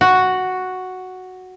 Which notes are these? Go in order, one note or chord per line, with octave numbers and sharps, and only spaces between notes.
F#4